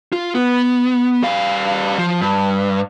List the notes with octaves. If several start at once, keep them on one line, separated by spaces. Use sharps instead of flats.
F4
B3
G3 F5
F3
G2